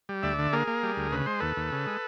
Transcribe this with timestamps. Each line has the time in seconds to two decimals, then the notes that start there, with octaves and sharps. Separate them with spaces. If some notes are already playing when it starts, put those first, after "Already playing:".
0.09 G3
0.23 D2 D5 E5
0.39 D3
0.53 A#3 G#4 A#4
0.67 A#3
0.83 G3
0.97 D2
1.12 C#3 B4
1.26 G#3 C5
1.40 D#2 A4 B4
1.57 D#2
1.72 C#3
1.87 G#3